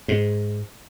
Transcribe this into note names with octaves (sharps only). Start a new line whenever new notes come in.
G#2